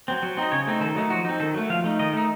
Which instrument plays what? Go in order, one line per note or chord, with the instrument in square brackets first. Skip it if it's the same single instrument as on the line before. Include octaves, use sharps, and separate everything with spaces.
[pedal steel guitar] F#3 C4
F#3
C4 D#4 D#5
C#3 C#5
A3 C4 D#4
D#3 A4
F#3 A3 D#4
F3 F#4
C4 D#4
D#3 A4
F#3 A3
F3 F5
A3 D#4
D#3 D#5
A3 D#4